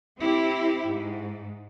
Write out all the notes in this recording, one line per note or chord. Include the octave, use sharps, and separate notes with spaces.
C4 E4 G4
G#2